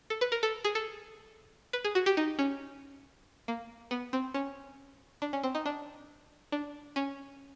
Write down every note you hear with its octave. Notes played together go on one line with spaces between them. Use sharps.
A4
B4
A#4
A4
G#4
A4
B4
G#4
F#4
G4
D#4
C#4
A#3
B3
C4
C#4
D4
C#4
C4
D#4
D4
D4
C#4